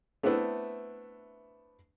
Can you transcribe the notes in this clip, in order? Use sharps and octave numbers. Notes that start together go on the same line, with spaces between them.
A3 B3 C4 D4 E4 B4